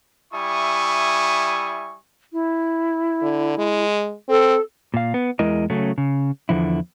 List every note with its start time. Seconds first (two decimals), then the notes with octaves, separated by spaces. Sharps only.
0.33 G3 E4 E5 G#5 C#6 D#6
2.32 E4
3.22 D3
3.58 G#3
4.29 C4 A4
4.94 A#2 F5
5.14 B3
5.39 E2 G#3 E4 A#4 D#5
5.70 C#3 F#3 A3 C#4
5.98 C#3
6.49 E2 D3 F3 E4